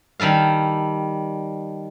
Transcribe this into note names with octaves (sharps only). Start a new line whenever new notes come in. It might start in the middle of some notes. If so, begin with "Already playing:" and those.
D#3 G3 A4 F5